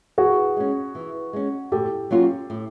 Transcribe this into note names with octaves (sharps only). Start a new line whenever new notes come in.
E3 F#4 G#4
G#3 C#4
E3
G#3 C#4
A2 G4 A4
F#3 A#3 C#4 F4
A2